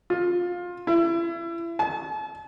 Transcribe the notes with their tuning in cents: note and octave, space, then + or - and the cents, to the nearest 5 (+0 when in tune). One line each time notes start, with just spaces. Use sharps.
F4 +20
E4 +30
A5 -40